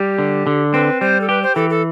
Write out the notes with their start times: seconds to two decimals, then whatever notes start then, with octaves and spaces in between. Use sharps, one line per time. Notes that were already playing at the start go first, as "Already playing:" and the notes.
Already playing: G3 G4
0.18 D3
0.47 D3
0.74 C4 B4
1.01 G3 C5
1.21 A4
1.29 G4 B4
1.43 C5
1.55 E3 A4
1.70 A4